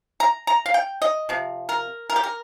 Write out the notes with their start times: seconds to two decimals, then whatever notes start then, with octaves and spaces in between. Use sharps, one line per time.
0.20 A#5
0.47 A#5
0.66 F5
0.74 G5
1.02 D#5
1.29 C3 F3
1.69 A#4
2.10 A#4
2.16 G4
2.24 A#4